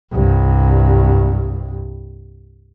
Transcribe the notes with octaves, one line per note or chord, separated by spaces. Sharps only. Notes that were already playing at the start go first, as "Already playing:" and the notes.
C2 G2